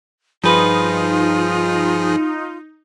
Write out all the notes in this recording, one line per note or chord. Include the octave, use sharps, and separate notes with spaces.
G2 F3 D#4 F4 G#4 B4